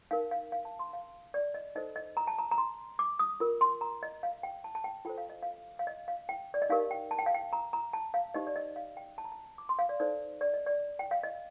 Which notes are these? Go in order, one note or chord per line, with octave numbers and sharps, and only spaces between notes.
D#4 A#4 F5
F5
F5
A5
C6
F5
D5
D#5
D#4 A4 C5 D#5
D#5
A#5
A5
A#5
A#5
C6
D6
D#6
F4 A#4
C6
A#5
D#5
F5
G5
A5
A5
G5
F4 A4 C5 G5
F5
D#5
F5
F5
D#5
F5
G5
D5
D#5
D#4 G4 A#4 F5
G5
A5
G5
F5
G5
A#5
A#5
A5
F5
D#4 G4 C5 D#5
D5
D#5
F5
G5
A5
A#5
A5
D6
C6
F5
D5
D#4 A4 C5 D5
D5
D#5
D5
G5
F5
D#5